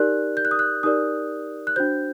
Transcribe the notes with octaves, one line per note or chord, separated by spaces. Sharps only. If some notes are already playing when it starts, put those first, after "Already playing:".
Already playing: D#4 G4 A#4 D5 F#6
G6
F#6
D#6
F#6
D#4 G4 A#4 D5 D#6
F#6
D4 F#4 C5 G6